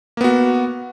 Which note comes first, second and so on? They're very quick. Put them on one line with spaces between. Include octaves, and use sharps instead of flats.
A#3 B3 F#4